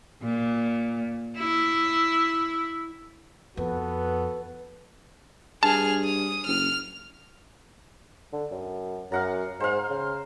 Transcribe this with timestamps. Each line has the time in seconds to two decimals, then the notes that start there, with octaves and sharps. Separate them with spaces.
0.23 A#2
1.37 E4
3.57 F2 B3 F#4 A4 B4
5.63 G2 G#4 A5 F6
6.04 D#6
6.47 F#1 F6
8.33 D3
8.51 F#2
9.12 F#2 F5 F#5 A#5
9.60 G#2 C5 F5
9.90 C#3